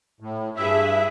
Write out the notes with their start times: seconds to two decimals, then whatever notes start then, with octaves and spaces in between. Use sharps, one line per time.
0.20 A2
0.56 G2 E4 G#4 B4 E5